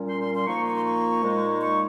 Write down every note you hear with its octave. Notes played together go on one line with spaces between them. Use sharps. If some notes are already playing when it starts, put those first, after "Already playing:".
Already playing: A#2 G3 C#4
C6
C6
C6
A#2 F3 A#3 D#4 C#6
C#6
C6
C#6
A#2 G#3 D#4
C#6